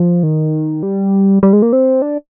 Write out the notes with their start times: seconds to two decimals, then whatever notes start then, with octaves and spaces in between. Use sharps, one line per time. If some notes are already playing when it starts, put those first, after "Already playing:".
Already playing: F3
0.23 D#3
0.83 G3
1.43 G3
1.53 G#3
1.62 A#3
1.73 C4
2.02 D4